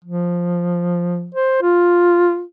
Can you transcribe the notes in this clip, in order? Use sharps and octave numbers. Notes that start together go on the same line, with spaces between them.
F3
C5
F4